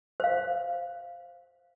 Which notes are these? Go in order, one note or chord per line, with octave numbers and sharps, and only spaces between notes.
C5 F5